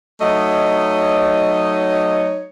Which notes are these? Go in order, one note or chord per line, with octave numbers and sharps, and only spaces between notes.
F#3 A3 D#4 C#5 D#5